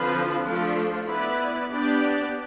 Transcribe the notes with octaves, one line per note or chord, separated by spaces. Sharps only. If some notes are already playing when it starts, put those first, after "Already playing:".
Already playing: D3 F3 C4 F4 B4
F3 A3 D4 F4
B3 E4 B4 D5
B3 D4 G4 D5